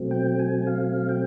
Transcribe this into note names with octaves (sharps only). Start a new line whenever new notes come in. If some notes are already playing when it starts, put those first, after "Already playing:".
Already playing: B2 F#3 A3 C4
G5
G#5
F5
G5